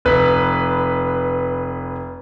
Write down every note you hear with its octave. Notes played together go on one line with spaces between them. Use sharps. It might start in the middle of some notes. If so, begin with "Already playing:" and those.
F1 B4